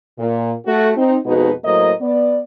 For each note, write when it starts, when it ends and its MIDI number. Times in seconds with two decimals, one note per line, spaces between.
0.18 0.52 46
0.65 0.90 57
0.65 0.90 66
0.96 1.16 60
0.96 1.16 63
1.25 1.52 41
1.25 1.52 47
1.25 1.52 56
1.25 1.52 63
1.25 1.52 66
1.25 1.52 71
1.64 1.91 45
1.64 1.91 54
1.64 1.91 58
1.64 1.91 72
1.64 1.91 75
2.00 2.39 59
2.00 2.39 74